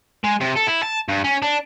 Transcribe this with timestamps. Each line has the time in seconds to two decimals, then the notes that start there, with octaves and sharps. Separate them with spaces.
0.24 G#3
0.41 C3
0.56 A4
0.67 E4
0.83 A5
1.09 G2
1.24 C#4
1.42 D4